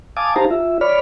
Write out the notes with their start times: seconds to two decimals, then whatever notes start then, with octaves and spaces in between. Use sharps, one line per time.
0.17 F5 G#5 A5 D6 D#6
0.36 D#4 G4 C5 F5 A5 A#5
0.51 F4 E5
0.81 C#5 D5 B5 F6